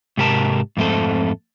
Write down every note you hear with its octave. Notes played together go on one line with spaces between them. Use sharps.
G#2 C3 G4 A#4 A5
F2 G#2 A3 C4 A4